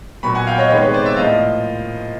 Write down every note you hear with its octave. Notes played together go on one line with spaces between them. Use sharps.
A#2 F#3 B3 B5 C#6
F#5 G#5
F5 G5
C#5 D#5
C3 D#3 G#3 B3 B4 C#5
B4 C#5
C5 D5
D5 E5
A2 F3 A#3 D#5 F5